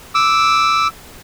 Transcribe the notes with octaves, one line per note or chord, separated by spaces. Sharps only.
D6 E6